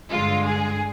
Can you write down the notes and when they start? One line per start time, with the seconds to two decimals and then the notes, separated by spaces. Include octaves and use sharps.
0.10 G2 D3 G#3 F4
0.46 G#4